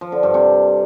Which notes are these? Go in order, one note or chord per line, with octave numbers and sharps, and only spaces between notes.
F3
D3
G2
C3